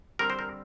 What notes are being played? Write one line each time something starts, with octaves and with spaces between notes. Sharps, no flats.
D3 G3 C4 A#4
C5
A#4